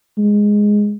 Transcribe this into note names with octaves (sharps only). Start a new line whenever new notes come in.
G#3